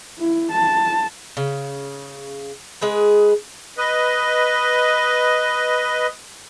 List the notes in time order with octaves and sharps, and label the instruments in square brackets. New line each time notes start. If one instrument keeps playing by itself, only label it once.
[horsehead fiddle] E4
A5
[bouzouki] C#3
G#3 G#4 B4
[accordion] B4 D#5